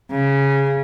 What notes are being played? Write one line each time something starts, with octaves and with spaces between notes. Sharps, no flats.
C#3